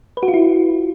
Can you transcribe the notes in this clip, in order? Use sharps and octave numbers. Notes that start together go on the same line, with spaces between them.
B4
F#4
F4
E4